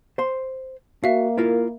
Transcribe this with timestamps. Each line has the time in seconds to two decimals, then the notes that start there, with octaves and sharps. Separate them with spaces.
0.18 C5 C6
1.04 A#3 F#4 E5 F5
1.38 E4 F4 A#4